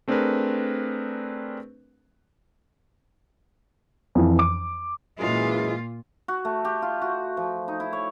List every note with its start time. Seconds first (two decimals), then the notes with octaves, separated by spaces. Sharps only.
0.08 A3 C4 D4 G#4 A#4 B4
4.15 F2 E3
4.39 D6
5.19 F#2 A#2 E3 G#3 F4
6.28 F#4
6.45 A3
6.65 G4
6.82 F4
7.02 F#4
7.37 F3
7.68 D#4
7.80 E4
7.93 C#5